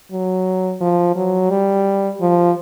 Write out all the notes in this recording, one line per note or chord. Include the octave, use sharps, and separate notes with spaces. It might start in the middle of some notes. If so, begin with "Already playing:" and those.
F#3
F3
F#3
G3
F3